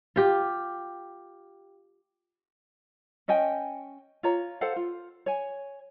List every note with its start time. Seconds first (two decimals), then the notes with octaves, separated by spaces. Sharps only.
0.16 F4 G4
3.28 C#4 D#5 G5 G#5
4.23 F4 C#5 A#5
4.61 A4 C5 F5 F#5
4.76 F4
5.26 C#5 G#5